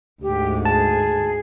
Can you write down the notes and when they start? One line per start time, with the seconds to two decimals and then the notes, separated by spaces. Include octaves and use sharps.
0.22 D2 G#2 G4
0.65 G#4 A5